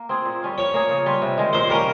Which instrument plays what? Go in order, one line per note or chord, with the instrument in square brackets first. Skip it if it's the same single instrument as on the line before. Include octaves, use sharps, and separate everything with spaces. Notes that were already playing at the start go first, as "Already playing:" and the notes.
Already playing: [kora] A#3
C4 F4 G#4
A#2
G3 C#4 F4
[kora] F3 [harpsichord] C#5
[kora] A#3 C#4 G#4
C#3
G3 C#4 F4
C3
D#3 G#3
[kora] A#2 [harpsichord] C5
[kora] G3 A#3 C#4 [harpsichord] A#4